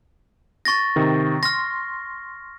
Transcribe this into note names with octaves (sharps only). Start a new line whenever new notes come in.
C#6 A6 A#6
C3 D#3
C6 F6 A#6